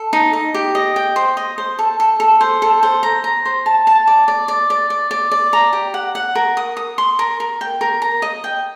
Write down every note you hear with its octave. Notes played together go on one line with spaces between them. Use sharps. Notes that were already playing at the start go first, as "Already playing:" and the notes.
Already playing: A4
D#4
D#5
G4
D#5
G5
C5
D#5
C5
A4
A4
A4
C5
A4
C5
A#5
A#5
C5
A5
A5
D5
D5
D5
D5
D5
D5
D5
A#5
G4
F#5
F#5
A#4
D#6
D#6
C6
A#4
A#4
G5
A#4
A#5
D#5
G5